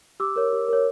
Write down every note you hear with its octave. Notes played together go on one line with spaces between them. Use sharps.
G4 D6 E6
A#4 C#5
G4
A#4 C#5